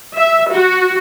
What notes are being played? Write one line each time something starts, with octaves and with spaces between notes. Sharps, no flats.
E5
F#4